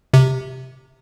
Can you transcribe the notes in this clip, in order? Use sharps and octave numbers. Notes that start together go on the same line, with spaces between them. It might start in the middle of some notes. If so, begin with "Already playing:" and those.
C3